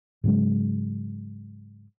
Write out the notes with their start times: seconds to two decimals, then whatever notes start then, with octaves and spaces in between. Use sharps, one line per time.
0.24 G#2 C#3 F#3 G#3